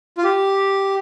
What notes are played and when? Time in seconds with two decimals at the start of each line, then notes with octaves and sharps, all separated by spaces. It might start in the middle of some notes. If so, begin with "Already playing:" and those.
0.18 F4
0.24 G4